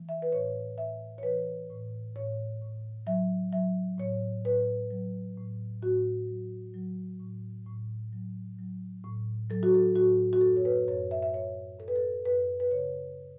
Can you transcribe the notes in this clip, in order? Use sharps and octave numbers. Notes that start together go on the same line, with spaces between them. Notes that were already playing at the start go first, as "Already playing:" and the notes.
Already playing: E3
E5
B4
A2 C#5
A2 E5
C#5
E3 B4
A2
A2 C#5
A2
F#3 E5
F#3 E5
A2 C#5
A2 B4
F#3
A2
A2 F#4
F#3
F#3
A2
A2
F#3
F#3
A2
F#3 A4
F#4
A4
A2 F#4
F#4
F#2 A4
C#5
B4
F#2 C#5
E5
E5
F#2 C#5
F#2 A4
B4
A4
F#2 B4
B4
C#3 C#5